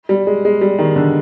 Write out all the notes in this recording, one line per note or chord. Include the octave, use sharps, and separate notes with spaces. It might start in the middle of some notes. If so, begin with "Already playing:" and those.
G3
G#3
G#3
G3
D#3
D3